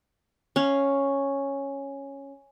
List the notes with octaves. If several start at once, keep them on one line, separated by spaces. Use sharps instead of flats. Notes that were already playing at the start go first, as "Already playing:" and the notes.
C#4 F5